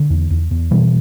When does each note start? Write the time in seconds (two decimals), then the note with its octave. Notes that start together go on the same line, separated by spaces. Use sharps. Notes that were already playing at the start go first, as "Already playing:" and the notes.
Already playing: D3
0.10 E2
0.30 E2
0.51 E2
0.71 B2 E3 G3